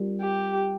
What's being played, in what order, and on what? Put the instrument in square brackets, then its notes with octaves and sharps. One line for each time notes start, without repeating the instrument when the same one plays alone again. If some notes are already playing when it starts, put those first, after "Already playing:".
Already playing: [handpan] G3 C4 F4 A#4
[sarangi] G4